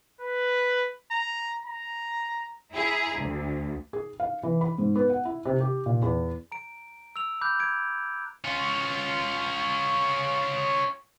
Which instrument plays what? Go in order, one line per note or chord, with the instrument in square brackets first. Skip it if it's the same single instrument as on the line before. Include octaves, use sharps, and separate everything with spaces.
[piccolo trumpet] B4
A#5
A#5
[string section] E4 G#4 A#5
D2
[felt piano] G#4
F5
E3
B5
G#2
B3
F#5
E4
C3
G4
A#2
E2
[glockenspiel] A#5 D7
E6 F7
B5 D6 F#6 G6
G#6 D7
[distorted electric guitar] C#4 F4